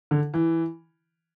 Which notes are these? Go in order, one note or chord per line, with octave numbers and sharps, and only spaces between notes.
D3
E3